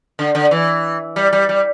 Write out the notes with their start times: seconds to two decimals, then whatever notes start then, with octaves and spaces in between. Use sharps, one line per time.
0.19 D3
0.35 D3
0.51 E3
1.16 G3
1.33 G3
1.49 G3